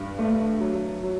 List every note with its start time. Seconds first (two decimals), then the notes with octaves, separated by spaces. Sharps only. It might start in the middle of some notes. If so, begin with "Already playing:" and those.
Already playing: G2
0.19 A3
0.61 F#3
1.03 F#3